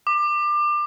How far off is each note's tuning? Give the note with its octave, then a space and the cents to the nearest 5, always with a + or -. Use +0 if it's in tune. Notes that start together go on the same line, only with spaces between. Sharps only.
D6 +25